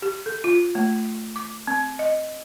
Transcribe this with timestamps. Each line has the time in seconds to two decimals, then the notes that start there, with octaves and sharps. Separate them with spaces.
0.02 G4
0.26 A4
0.44 F4
0.75 A3
1.36 D6
1.67 C4
1.99 D#5